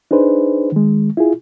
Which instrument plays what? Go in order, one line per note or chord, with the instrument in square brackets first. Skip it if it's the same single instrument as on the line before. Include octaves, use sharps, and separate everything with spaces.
[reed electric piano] D4 D#4 G#4 B4 C5
D#3 G#3
E4 F4 G#4